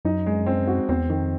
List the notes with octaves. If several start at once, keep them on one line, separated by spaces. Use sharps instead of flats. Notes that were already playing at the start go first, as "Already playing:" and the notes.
F#2 D#4
G#3
C4
F#4
E2 C4
F2 D#3